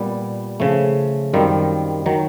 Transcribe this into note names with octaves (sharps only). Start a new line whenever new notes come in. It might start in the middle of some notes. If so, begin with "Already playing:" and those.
Already playing: A#2 G3 B3
C#3 F3 A3
F#2 D#3 G3 C4 F4
D#3 F#3